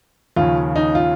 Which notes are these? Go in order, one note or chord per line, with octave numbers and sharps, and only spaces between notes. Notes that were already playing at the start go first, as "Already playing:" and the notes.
D#2 C#3 F3 C#4 F4
D#4
F4